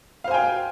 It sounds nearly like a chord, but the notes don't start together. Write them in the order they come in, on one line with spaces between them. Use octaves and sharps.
F5 C5 G#5 G5